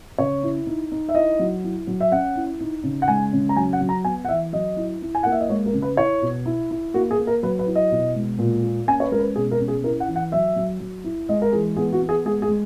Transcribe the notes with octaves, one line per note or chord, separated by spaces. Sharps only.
C#3 C#5
E4
D#4
D#4
E5
E4 D#5
F#3
E4
F#3
E5
C#4 F#5
E4
D#4
C#3
F#5
G#3 G#5
C#3
A#5
F#3 G#5
F#5
F#3
A#5
B3 G#5
F#5
E3 E5
F#3 D#5
E4
E4
G#5
A#3 F#5
E5
D#5
G#3 C#5
A#4
C#3
B4
E4 C#5
B2
E4
E4
A#3 F#4
G#4
A#3
A#4
F#3 B4
B4
E4
D#5
B2
G#3
A#2
A#3
C#4 G#5
C#5
B4
G#3 A#4
B4
B2 G#4
A#4
C#4
G#4
E4 A#4
F#5
E3
F#5
F#3 E5
F#3
F#3
E4
G#3 D#5
A#4
E3 G#4
B3 G#4
F#4
B3
G#4
G#3 G#4
G#4
G#3